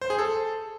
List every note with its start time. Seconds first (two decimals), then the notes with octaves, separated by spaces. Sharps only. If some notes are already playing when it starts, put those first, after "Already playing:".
0.02 C5
0.10 G#4
0.19 A4